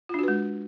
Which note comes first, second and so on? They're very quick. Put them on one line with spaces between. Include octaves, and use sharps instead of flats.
F4 D4 F#4 B4 G#3